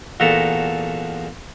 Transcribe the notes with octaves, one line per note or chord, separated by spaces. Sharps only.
E2 A#2 F#4 A4 A5 A#5